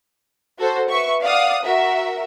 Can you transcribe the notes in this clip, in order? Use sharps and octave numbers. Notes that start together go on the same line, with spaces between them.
F#4 A4 C5
B4 E5 C#6
D5 F5 F#5 D#6
F#4 A#4 E5